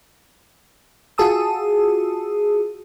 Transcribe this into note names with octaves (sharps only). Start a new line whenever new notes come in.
F4 F#4 G#4 A5 D#6 E6